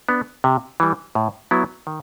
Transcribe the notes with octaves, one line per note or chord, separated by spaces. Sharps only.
B3 D4
C3
E3 G3
A2
F#3 B3 E4
D#3